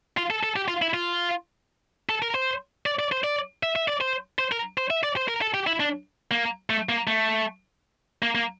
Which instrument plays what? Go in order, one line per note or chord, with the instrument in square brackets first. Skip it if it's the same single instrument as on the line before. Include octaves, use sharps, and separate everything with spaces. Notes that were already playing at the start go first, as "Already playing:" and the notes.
[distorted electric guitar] F4
A4
A4
G4
F4
E4
F4
A4
A#4
C5
D5
D5
C5
D5
E5
E5
D5
C5
C5
A#4
C5
E5
D5
C5
A#4
A4
G4
E4
D4
A#3
A3
A#3
A3
A#3
A#3